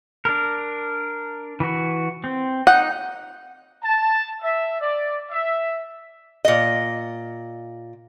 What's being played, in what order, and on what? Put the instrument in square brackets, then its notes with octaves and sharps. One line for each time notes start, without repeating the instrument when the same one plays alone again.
[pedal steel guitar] D4 A#4
E3 F#4
C4
[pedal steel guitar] D#4 G5 [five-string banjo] F#5
[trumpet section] A5
E5
D5
E5
[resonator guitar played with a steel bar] A#2 D#5